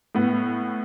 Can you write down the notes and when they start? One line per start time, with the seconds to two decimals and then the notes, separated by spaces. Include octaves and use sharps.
0.15 A2 B3